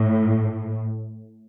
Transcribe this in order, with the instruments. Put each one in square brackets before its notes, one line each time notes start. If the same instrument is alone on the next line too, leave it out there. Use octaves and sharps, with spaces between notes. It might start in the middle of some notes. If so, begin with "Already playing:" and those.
Already playing: [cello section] A2